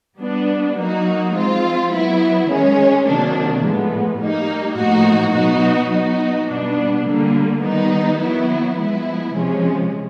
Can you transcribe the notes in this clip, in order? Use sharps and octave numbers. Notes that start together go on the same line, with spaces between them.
G3 B3 D4
F#3 A#3 D#4 F#4
F3 G#3 C4 F4
F#3 B3 E4
D#3 G#3 C#4
C3 D#3 F#3 A#3 D4
A2 F3 G#3 B3
G3 A#3 D#4
A2 F3 A#3 D#4 F#4
B2 F#3 B3 D#4 F#4
F#3 B3 D#4 F#4
B2 G3 B3 D4
D3 G3 A#3
D#3 G3 B3 D#4
D#3 F#3 B3 E4
F3 G#3 B3 E4
C3 F3 G#3 C#4